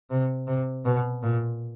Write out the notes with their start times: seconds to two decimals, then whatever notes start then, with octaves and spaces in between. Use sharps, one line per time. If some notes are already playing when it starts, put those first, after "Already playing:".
0.11 C3
0.47 C3
0.85 B2
1.23 A#2